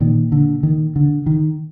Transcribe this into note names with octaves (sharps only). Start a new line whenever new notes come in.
A#2 D#3
D3
D#3
D3
D#3